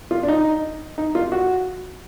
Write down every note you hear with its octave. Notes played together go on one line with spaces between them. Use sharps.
F4
D4
D#4
D#4
F4
F#4